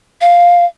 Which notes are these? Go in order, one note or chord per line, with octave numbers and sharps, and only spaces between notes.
F5